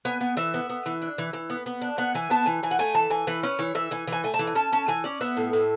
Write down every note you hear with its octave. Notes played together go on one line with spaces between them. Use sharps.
B3 G#5
B3
E3 E5
B3
B3
E3
D4
E3
E3
B3
B3
D4
B3 F#5
E3 G#5
B3 A5
E3 G#5
E3 G#5
F#5
A3 G#5
E3 A5
E3 G#5
E3 B4
C#4 B4
E3 C#5
E3 E5
E3 G#5
E3 G#5
A3 G#5
A5
E3
G#5
C#4 A5
C#4 A5
E3 G#5
C#4 D5
B3 E5
A2
A2